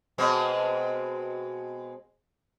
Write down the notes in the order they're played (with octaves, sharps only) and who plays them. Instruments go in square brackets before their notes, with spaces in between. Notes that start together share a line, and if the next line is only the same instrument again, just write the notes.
[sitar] B2 G#3 C4